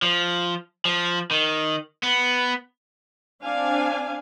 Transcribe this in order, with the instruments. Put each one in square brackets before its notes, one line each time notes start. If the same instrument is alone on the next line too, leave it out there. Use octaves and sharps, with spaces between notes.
[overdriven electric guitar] F3
F3
D#3
B3
[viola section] C4 D4 F5 G#5